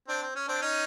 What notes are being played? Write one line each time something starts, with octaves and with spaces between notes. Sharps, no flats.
C4 D4
C4
C#4
C4 D4
C#4 D#4